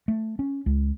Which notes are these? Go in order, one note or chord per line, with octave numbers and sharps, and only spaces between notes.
A3
C#4
C#2